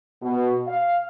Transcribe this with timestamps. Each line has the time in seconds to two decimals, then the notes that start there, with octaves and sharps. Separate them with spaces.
0.22 B2
0.67 F5